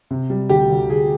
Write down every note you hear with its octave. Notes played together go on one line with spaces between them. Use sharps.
C3
G3
D2 G4
D2
D2 G#4